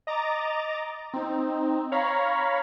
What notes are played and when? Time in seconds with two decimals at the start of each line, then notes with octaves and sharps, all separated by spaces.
0.07 D#5 A#5 D6 A6
1.14 C4 D#4
1.92 C#5 F5 A#5 B5